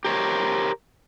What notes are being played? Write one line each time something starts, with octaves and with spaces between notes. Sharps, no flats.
G4 A#4 C5 C#5